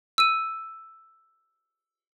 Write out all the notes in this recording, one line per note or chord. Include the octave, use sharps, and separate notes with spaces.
E6 D#7